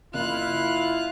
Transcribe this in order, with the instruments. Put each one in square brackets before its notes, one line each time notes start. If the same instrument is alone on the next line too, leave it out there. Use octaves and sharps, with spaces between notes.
[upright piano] F#1 [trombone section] E4 [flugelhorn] F4 [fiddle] F5 F#6